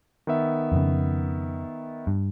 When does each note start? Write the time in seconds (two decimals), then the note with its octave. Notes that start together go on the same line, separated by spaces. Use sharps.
0.27 D#3 B3 E5
0.72 F2 C#3
2.07 G2